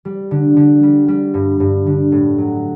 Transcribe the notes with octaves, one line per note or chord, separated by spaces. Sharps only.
G3
D3
D3
G3
G3
G2
G2
D3
A2
F#3